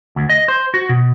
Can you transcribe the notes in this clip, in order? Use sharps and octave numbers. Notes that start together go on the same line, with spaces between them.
D2
D#5
C5
F#4
B2